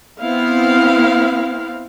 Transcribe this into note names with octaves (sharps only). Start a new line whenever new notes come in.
B3 C4 E4 F5